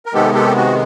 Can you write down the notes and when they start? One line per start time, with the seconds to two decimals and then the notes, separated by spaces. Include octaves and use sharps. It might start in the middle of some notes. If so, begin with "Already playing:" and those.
0.06 A#4
0.14 C3 D#3 G#3 B3 G4 A4
0.34 G4 A4
0.56 F#4